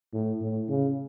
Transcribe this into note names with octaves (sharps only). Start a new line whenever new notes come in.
A2
A2
C#3